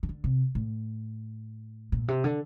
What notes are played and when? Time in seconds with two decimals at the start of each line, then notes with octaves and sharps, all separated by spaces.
0.03 D#3
0.09 D3
0.24 C3
0.55 A2
1.92 A#2
2.08 C3
2.24 D3